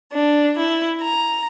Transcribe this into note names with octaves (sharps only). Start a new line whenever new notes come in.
D4
E4
A#5